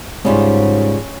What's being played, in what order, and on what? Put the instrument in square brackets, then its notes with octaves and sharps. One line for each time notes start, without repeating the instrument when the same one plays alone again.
[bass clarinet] G#2 [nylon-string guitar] C#3 G3 F4 [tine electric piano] G#3 [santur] C#4 B5